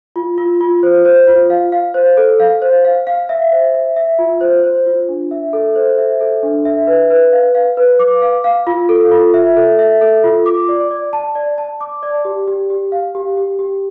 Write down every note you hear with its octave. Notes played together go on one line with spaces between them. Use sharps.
F4
F4
F4
C5
C5
F4
F5
F5
C5
A4
F5
C5
F5
F5
E5
C5
E5
E5
F4
C5
C5
F4
D4
E5
A4
C5
E5
A4
D4
E5
B4
B4
F5
F5
B4
D6
F5
F5
F4
A4
F4
E5
A4
E5
A4
F4
D6
D5
D5
A5
D5
A5
D6
D5
G4
G4
G4
F5
G4
G4
G4